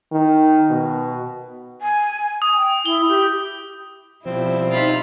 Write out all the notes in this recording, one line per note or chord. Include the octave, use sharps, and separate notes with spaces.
D#3
B2
G#5
D#6
G5
E4 G7
G4
B2 F3 G3 C4 E4
D#4 F4 B5